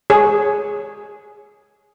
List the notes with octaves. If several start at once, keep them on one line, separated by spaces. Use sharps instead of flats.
G#4 C#5